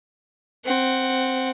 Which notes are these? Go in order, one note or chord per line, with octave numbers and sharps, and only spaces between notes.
C4 F#5